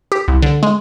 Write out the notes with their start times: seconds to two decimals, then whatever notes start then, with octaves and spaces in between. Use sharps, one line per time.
0.12 G4
0.28 C2
0.42 D3
0.63 G#3